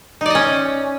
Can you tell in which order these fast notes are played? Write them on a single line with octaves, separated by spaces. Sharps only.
D#4 D5 D#5 C#4